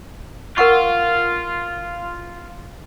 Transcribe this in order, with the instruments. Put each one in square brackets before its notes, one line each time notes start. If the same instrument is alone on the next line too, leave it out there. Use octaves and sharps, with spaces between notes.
[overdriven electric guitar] F4 [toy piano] A#4 F#5 C#6